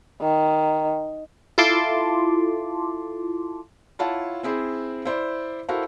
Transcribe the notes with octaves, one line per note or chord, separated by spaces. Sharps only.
D#3
E4 F4 A4 A5 C6 D6
E4 F4 C#5 F#5 A5
C4 E4 G#4 C5
E4 C5 D5
E4 F#4 A4 A#4 C5 F5